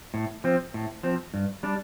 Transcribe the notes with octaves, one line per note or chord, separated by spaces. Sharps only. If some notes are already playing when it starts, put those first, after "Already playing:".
A2
F3 C4
A2
F3 C4
G2
G3 D4